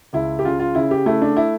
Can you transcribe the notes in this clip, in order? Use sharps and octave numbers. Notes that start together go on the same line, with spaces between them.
C#2 E4
G4
C#3 F4
F4
C#3 E4
G4
A3 E4
D4
E4